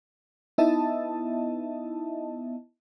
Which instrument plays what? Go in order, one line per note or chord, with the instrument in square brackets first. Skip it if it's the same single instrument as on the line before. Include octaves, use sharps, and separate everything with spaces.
[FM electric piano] B3 D#4 E4 D#5 E5 A5